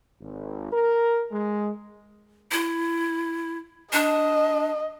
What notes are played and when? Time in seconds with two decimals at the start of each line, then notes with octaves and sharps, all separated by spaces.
0.21 G#1
0.72 A#4
1.32 G#3
2.51 E4
3.93 D4 D#5